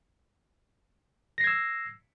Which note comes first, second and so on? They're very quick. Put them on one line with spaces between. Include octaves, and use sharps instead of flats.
A#6 C7 G#6 E6